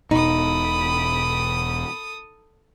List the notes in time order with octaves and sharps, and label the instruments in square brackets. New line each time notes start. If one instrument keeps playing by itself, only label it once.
[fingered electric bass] E1 B2 [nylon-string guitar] D#4 [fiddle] A4 D#6 [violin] B5 D7